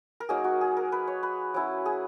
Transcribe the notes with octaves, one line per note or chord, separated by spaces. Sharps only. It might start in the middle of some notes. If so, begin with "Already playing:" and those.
A#4
F#3 A#3 D#4 G#4
F#4
G#4
A#4
B4
C#5
B4
F#3 C#4 E4
G#4